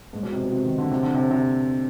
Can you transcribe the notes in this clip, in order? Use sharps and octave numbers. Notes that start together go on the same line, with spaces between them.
G#2
B2
C3
B2
C3
D#3
D3
C3
D3
C3
C3